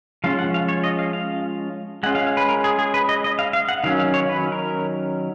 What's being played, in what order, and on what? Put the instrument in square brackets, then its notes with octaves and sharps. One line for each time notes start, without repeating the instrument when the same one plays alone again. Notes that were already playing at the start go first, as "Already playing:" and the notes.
[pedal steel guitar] F3 G#3 C#4 F4 F5
F#5
F5
C#5
D#5
F5
F5
G#3 C#4 F4 F#5
F5
F5
B4
A#4
G#4
G#4
B4
D#5
D#5
F5
F5
F#5
D#3 F#3 C#4 F5
F5
C#5
B4
A#4